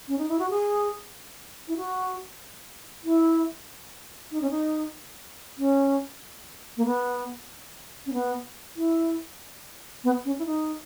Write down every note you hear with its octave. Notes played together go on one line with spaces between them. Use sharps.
C#4
D#4
E4
F#4
G#4
E4
F#4
E4
D#4
C#4
D#4
C#4
A#3
B3
C#4
B3
E4
B3
C#4
E4
D#4